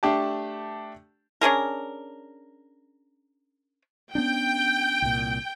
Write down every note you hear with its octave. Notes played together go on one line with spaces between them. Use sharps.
A3 D4 G4 A5
C#4 D4 G#4 A#4
B3 C#4 D4 G5
C2 A#2